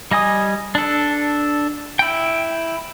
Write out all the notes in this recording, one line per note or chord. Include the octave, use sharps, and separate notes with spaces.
G3 D#5 G#5 D#6
D4 A4
E4 G5